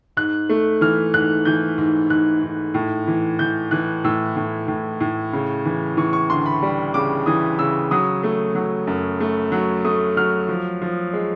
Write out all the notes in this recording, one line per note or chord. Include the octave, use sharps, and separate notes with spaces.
G#2 F#6
A3
E3 F6
G#2 F#6
E3 G6
G#2
G#2 F#6
G#2
A2
E3
E3 G6
E3 F#6
A2 E6
A2
A2
A2
C#3
E3
E3 C#6
C#6
D2 C6
B5
G3
C#3 D6
E3 D#6
C#3 E6
F#3 D#6
A3
F#3
F#2
A3
F#3
A3 D#6
F#3 F6
F3
F3
G#3